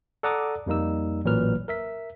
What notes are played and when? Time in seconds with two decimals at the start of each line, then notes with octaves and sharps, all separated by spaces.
0.23 A4 D5 F#5 A#5 D6 D#6
0.66 F2 G3 A#3 D#4 E6
1.24 A1 A#2 F#3 B4 F6
1.68 A#4 E5 B6